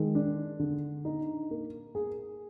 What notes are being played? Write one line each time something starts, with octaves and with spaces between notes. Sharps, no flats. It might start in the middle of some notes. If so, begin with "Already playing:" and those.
Already playing: D#3 G#3
D4
D3
D#4
A#3
G#4